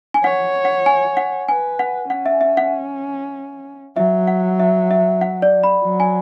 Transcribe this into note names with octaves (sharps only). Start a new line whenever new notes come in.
G#5
C#5 F#5
F#5
G#5
F#5
B4 G#5
F#5
C#4 F#5
E5
E5
F#5
F#3 E5
F#5
E5
E5
F#5
D5
B5
F#3
G#5